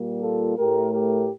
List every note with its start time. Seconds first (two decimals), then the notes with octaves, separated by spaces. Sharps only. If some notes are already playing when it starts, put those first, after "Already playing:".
Already playing: A#2 G3 A#3
0.22 F4 A4
0.57 A2 A3 G4 A#4
0.92 G4 A#4